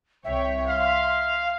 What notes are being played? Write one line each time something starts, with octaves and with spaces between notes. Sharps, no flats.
C2 C#5 E5 G5
F5 C6